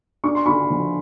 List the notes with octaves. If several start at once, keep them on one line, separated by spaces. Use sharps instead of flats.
D4 C#6
C6
D3 B5 C#6
F3